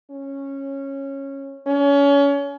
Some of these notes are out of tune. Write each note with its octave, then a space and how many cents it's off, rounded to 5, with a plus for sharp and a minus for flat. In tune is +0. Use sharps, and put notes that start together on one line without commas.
C#4 -15
C#4 +30